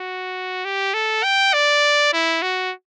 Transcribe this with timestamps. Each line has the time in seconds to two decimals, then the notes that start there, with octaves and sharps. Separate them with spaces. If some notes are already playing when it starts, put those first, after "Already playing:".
Already playing: F#4
0.65 G4
0.94 A4
1.24 G5
1.54 D5
2.13 E4
2.42 F#4